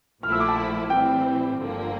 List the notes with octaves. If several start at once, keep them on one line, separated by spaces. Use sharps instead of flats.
A#1 A#2 F3 A3 E4 F6
E6
D6
A5
A2 E3 G3 C4 G5
G1 G2 D3 F3 A#3